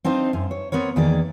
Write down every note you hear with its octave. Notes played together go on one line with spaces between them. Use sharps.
C4 D4 D#4 C5 F5
F#2
C#5
B3 C4 A#4 C#5
E2 D#3 A#3 G#4 D5